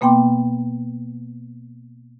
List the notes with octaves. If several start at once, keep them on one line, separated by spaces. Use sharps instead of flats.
B2 A#3 B3 G5 C6 D6